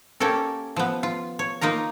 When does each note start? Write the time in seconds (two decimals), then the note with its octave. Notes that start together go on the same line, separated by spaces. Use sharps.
0.20 A#3 C#4 G4 A4 A#4
0.76 F3 B3
1.03 F4
1.39 C#5
1.61 A#3 D#4 F4 A#4 A#5